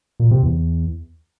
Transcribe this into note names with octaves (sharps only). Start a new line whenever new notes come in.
A#2
C3
E2